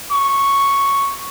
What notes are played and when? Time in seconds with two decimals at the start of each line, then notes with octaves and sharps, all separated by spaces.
0.11 C#6